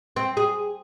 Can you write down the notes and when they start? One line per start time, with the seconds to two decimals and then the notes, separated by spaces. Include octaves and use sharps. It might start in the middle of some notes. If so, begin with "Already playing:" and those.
0.16 C4
0.37 G#4